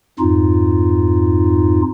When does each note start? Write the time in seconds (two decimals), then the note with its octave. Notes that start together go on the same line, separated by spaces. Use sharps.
0.19 F2 G#2 D#4 F4